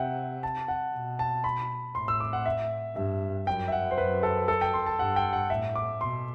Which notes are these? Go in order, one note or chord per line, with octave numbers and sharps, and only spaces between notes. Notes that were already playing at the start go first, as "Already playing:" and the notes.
Already playing: C3 E5 F#5 G5
A5
F#5
B2
A5
B5
A2 C6
E6
D6
F#5
E5
G2 E5
F#2 G5
E5
F#5
C5
F#2 B4
A4
A4
G5
C6
A5
G2 F#5
G5
F#5
A2 E5
D6
B2 C6